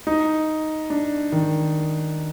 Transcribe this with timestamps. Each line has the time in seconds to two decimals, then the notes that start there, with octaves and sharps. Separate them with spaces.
0.07 D#4
0.90 D4
1.32 D#3